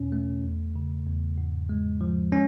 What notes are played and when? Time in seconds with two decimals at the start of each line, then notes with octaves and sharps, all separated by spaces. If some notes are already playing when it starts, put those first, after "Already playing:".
Already playing: E2 B2 C#4
0.12 A3
0.44 E2
0.76 C#3
1.06 E2
1.38 G#2
1.69 G#3
2.01 F3
2.32 G#3 C#4